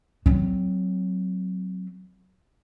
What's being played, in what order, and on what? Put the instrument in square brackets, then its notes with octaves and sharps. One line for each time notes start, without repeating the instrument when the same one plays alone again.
[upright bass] F#3 C4